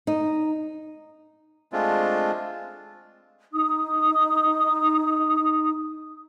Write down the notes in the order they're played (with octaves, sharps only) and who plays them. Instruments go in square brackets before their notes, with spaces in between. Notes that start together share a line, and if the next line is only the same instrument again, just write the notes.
[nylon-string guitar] D#4
[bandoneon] G#3 A3 C4 D4 F4
[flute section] D#4 D#6